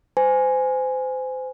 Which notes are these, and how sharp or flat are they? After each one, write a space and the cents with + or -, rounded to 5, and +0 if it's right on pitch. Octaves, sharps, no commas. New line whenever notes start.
C5 -30 G#5 +0